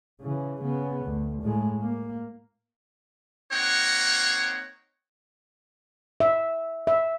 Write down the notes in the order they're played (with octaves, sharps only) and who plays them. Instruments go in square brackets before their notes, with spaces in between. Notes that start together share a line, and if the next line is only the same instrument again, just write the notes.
[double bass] C#3 E3
C#3 B3
D2
A2 G#3
A#3
[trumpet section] A#3 C4 D#4 C#5 F#5
[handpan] E5
E5